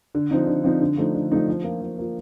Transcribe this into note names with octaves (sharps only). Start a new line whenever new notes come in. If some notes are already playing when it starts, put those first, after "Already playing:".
D3
F3 C4 D#4
D3
F3 C4 D#4
D3
F3 A3 D#4
D3
F3 A3 D#4
F3
A#3 F4
F3
A#3 F4